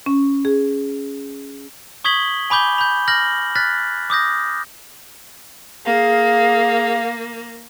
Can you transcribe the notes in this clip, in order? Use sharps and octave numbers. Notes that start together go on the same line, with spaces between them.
C#4
G#4
C#6 D#6 G#6 B6 F#7 G7
G#5 B5 D6 G6 G7
B5 G6
F6 G6 A#6 F#7
F6 F#6 A6 B6
D6 D#6 G6 A#6
A#3 G#4 F5